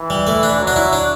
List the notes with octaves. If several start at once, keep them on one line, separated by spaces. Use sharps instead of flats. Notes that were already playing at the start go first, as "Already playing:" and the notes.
Already playing: E3
G3
A3
D4
F#3
D4
E4
D4